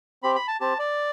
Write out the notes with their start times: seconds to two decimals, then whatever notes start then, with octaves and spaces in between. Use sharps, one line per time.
0.23 C4 G4 B5
0.35 B5
0.48 A5
0.60 C4 G4 A5
0.79 D5